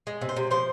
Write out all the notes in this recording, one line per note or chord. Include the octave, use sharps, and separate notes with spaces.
G#3
C3
C5
C3
F3 C5